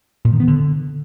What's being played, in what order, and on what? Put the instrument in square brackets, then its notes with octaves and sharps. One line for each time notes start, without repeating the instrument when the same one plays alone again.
[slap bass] A#2
D#3
B3
D3